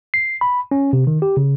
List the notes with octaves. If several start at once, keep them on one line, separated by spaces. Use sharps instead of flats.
C7
B5
C#4
C3
D#3
G4
C#3